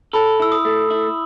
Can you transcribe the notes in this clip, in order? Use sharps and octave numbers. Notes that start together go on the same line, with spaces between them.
A4 B5
E4 E6
D#6
A3
E4